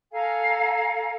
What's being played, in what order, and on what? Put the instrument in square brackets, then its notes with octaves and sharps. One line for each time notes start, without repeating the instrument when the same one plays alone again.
[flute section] A4 F5 G#5 A#5